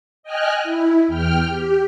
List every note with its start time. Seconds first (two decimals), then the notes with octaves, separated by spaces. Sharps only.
0.23 D#5 G5 G#5 F6 F#6
0.63 E4
1.08 E2 G5 F6
1.49 G4